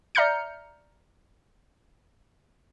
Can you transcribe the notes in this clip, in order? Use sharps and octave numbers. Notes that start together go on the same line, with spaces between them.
D5 E5 A#5 F6 G6 C#7